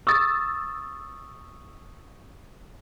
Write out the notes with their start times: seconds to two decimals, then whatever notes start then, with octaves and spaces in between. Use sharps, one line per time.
0.07 C#6 D#6 E6 A6